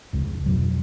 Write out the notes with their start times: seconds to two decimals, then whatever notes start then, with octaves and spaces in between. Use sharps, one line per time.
0.13 F1 C#2
0.46 F2 B2 F#3